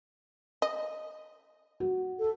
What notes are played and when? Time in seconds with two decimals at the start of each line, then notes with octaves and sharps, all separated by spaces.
0.62 D#5
1.80 F#4
2.19 A4